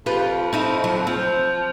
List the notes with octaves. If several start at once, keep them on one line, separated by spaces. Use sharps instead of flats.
F2 F4 G4 B4
C4 D#4 E4
F#3
F3 C4